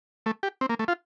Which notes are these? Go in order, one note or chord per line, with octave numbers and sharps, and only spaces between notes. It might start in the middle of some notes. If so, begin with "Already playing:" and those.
A3
G4
C4
A#3
A3
F4